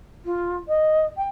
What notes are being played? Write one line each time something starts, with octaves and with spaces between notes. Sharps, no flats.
F4
D#5
G5